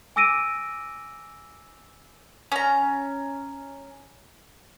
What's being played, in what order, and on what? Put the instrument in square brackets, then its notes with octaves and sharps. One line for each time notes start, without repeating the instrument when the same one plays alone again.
[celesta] G#5 D6 E6 A#6 D7 D#7
[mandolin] C#4 A#5